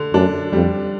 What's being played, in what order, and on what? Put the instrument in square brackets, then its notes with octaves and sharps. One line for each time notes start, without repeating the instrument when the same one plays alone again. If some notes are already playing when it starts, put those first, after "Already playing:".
Already playing: [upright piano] D3
[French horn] F#2 [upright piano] D4
[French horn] F2 [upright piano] G3